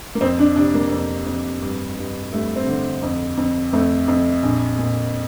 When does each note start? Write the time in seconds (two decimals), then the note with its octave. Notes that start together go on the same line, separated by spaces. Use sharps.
0.15 A#3
0.21 F2 C4
0.39 D4
0.56 C3 D4
0.74 A#3
0.91 F2
1.26 F2
1.62 G2
1.97 G2
2.32 G2 A3
2.56 C4
2.67 D3
3.03 F2
3.37 F2
3.73 F2 A3
4.08 F2
4.43 A#1
4.78 A#2